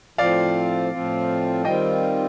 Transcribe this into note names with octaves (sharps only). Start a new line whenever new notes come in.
A2 F3 C4 F4 D5 F5
A2 F3 C4 F4
D#3 G3 C4 F4 D#5 G5